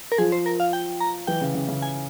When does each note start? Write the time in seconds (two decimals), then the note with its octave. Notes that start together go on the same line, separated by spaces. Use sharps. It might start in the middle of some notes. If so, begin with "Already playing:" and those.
0.12 A#4
0.18 F3 G#4
0.32 C5
0.46 A#4
0.60 F5
0.73 G5
1.01 A#5
1.27 E3 G5
1.41 C#3
1.54 C#3
1.68 C#3
1.82 G#5